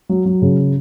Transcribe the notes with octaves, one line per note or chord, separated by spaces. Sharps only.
F#3
F#3
C#3